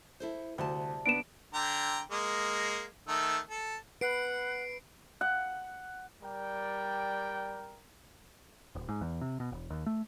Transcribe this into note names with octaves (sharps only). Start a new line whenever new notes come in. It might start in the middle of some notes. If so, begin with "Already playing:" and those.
E4 A4 C5
D2 C3 G3 A5
B3 D4 D7 E7
D3 G5 A#5
G#3 A#3
D#3 A3 E6
A4
B4 F#5 C7 D7
F#5
G3 A#4 D5 G5
D#1
G#2
E2
C3
B2
E1
D#2
A3